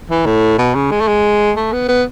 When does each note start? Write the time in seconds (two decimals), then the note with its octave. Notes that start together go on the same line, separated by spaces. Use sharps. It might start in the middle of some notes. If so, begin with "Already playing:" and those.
0.10 E3
0.26 A2
0.58 B2
0.75 C#3
0.91 G#3
1.01 A3
1.08 G#3
1.57 A3
1.73 B3
1.88 B3